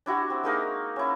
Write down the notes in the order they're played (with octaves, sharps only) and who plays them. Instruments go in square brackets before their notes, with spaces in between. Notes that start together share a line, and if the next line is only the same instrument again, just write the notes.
[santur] D4 E4 F#4 G4
C4
G#3 A#3 D#4 A#4
C#4 E4